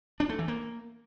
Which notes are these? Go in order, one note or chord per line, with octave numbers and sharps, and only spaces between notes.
D4
A3
E3
A#3